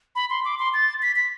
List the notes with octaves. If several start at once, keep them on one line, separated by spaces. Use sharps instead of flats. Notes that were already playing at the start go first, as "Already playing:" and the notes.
B5
C6
D6
C6
A6
B6
B6